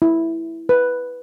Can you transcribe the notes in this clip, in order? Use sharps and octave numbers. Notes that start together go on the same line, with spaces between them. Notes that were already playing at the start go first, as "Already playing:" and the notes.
E4
B4